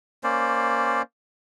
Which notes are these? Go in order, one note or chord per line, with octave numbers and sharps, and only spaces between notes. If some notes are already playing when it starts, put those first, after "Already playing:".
A#3 C#4 C5 D5